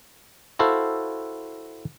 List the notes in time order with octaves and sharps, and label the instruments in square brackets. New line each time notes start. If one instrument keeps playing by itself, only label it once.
[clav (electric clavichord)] E4 F#4 A4 C5 F5